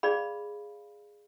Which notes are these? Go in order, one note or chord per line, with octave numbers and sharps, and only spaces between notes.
G#4 D5 F5 B5